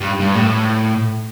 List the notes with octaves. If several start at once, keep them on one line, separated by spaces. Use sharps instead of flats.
G2
G2
A2